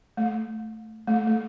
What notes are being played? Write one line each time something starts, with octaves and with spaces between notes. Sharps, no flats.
A3
A3
A3